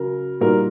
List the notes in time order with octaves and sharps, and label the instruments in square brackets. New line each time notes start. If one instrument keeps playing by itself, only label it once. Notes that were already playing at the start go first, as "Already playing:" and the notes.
Already playing: [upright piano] C#3 F#3 [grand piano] A#4
[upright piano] A#2 G3 A#3 D#4 F#4 [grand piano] A#4